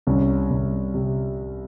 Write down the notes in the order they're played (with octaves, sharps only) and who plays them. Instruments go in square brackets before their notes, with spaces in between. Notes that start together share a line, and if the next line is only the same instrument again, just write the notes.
[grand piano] C2 C#4
C2
C3